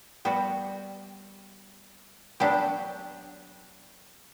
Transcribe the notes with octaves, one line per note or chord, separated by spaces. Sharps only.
G3 B3 F#4
F#3 B3 D4 G4